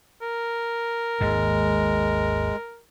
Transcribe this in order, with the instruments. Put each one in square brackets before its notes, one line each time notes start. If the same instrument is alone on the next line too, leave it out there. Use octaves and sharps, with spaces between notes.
[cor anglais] A#4
[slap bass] G#1 D#2 G#2 [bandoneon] G#3